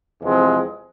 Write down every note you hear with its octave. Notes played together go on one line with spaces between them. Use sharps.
E2 C3 F3 G#3 C4